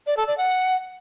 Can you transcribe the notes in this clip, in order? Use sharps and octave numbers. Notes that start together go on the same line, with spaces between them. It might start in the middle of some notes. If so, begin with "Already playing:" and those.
D5
A4
D5
F#5